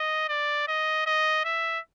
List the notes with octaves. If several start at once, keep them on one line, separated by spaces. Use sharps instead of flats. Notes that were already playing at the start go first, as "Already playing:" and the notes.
Already playing: D#5
D5
D#5
D#5
E5